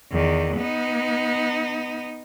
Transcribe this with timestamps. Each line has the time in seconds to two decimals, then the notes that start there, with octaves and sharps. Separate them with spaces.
0.11 E2 D#3
0.57 B3 D#4